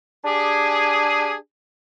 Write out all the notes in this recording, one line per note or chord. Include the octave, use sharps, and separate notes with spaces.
D4 G4 G#4